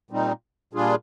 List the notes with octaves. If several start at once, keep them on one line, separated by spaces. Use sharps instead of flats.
A#2 G3 C4 D#4
A#2 G3 D4 F4 G#4